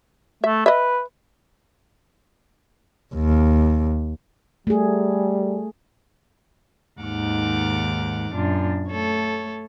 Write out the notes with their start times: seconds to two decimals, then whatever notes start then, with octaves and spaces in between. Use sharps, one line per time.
0.44 A3 E5
0.66 B4 D#5 E5
3.15 D#2
4.67 G3 A3 G#4
7.00 D#2 G#2 D#3 F#5 D6 F6
8.32 F#2 A#2 D4 F4
8.89 A3 A4 C#5